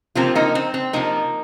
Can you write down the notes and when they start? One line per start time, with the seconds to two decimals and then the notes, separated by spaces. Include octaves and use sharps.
0.15 C3 F3 A#3 C4 F4
0.35 A#3 D#4
0.55 C4
0.74 C4
0.93 C3 F3 A#3 D#4